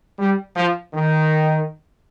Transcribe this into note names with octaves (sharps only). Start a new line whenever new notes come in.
G3
F3
D#3